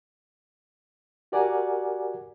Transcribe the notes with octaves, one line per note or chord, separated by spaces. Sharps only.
F#4 G4 A#4 D5 F#5 G#5